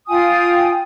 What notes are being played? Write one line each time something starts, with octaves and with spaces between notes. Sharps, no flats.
F4 G5 G#5 D#6